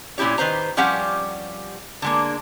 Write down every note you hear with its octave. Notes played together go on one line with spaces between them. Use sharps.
A#2 C#4 E4 G4 C#5
D#3 B4 C5 A#5
F3 G3 C#4 G4 F5 F#5
D3 G#3 A#3